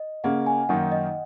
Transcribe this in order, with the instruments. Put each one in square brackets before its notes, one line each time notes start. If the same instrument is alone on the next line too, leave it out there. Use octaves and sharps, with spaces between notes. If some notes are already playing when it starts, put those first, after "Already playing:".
Already playing: [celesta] D#5
[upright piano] C#3 A#3 C#4 [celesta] F#5
[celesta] G#5
[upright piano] F#2 D#3 A#3 D#4 [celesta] F#5
[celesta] D#5